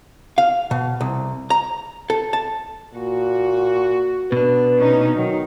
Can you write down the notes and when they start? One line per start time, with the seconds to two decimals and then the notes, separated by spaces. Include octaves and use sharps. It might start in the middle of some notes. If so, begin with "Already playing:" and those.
0.38 F5
0.71 B2
1.01 C2
1.50 A#5
2.10 A4
2.33 A5
2.95 A#2 F#4
4.32 B2 D4 B4
4.76 C#4 D#4
5.16 D#3 F#3